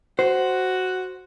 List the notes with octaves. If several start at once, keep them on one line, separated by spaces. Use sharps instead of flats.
F#4 C5